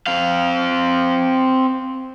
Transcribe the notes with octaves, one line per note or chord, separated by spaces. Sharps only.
C4 F5